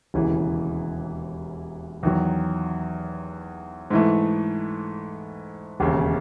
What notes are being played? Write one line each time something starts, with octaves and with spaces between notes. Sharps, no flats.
E1 D#2 C#3 E3
E2 D#3 F#3
G#2 E3 A3
E1 D#2 C#3